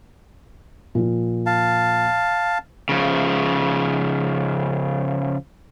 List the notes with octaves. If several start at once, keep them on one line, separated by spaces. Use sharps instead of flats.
A#2 F3
F5 A5
C#3 F3